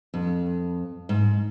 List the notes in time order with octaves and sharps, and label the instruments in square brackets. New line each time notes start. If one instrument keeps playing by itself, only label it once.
[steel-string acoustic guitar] F2
G#2